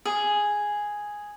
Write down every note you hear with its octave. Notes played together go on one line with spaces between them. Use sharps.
G#4